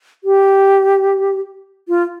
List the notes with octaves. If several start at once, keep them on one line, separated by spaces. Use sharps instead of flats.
G4
F4